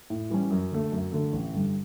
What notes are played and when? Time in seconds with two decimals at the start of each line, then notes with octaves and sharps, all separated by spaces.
0.10 A2
0.30 E3 G3 C#4
0.50 F#2
0.71 D3 A3
0.92 F#2
1.12 D3 A3
1.33 A1
1.53 G2 D3 G3